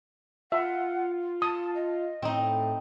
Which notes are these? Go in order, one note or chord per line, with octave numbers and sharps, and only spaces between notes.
F4 E5 F#5
A5 D#6
D#5
A2 C4 D#4